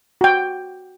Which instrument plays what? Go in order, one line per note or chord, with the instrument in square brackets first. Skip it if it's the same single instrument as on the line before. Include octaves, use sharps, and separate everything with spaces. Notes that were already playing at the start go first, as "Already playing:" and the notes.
[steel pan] F#4 G5